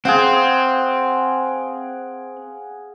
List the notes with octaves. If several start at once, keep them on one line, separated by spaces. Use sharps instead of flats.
C4 G#4 F5 F#5